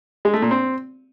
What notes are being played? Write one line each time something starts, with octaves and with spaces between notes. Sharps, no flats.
G#3
A3
A#2
C4